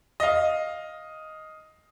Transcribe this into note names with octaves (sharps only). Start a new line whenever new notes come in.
D#5 F5